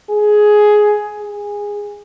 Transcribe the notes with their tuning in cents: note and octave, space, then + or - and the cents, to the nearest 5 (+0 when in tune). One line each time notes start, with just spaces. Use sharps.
G#4 +10
G#4 -15